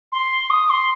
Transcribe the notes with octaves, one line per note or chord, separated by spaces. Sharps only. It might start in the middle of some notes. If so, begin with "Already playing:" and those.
C6
D#6
C6